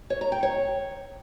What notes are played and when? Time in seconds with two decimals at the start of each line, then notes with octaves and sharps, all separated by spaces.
0.10 C#5
0.21 A#5
0.32 G5
0.43 C#5